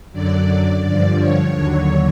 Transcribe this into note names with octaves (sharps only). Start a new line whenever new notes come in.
F#2 D3 F#3 D5
G2 D3 F3 D5
C#5
D#2 D3 F#3